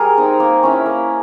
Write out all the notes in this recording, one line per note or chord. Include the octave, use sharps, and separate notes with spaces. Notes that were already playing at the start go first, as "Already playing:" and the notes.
Already playing: G3 G#4 A#4
C4 D#4
A#3
C#4 E4
A#3